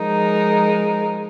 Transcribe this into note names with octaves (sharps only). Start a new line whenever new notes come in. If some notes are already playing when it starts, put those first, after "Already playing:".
Already playing: F3 G#3 D#4 A#4